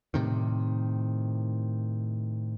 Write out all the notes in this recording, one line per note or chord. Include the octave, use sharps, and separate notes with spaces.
A2 C3 D#3